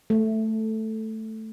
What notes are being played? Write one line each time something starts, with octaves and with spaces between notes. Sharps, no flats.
A3